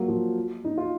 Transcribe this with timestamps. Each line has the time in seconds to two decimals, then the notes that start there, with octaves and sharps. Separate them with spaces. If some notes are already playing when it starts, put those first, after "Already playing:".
Already playing: F#3 A#3
0.08 F3
0.65 D#4
0.78 F4